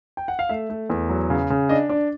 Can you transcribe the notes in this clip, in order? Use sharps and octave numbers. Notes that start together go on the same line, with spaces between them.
G5
F#5
F5
A3 E5
A3
E2
F#3
C#3
C#3
D4 D#5
D4 D5